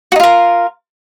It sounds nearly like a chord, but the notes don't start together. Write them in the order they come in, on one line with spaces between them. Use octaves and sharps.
F#4 D#4 F4 A#4